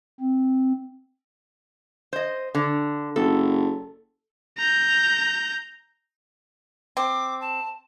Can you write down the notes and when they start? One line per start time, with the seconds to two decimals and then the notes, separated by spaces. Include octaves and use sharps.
0.20 C4
2.13 C5 D#5
2.55 D3
3.16 F#1 A4
4.58 A#5 G6
6.97 C4 D6
7.40 A5